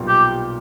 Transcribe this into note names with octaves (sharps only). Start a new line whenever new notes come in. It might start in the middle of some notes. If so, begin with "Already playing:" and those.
Already playing: B1 A#2 G3 B3
G4